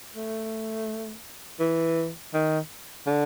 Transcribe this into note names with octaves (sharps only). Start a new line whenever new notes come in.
A3
E3
D#3
D3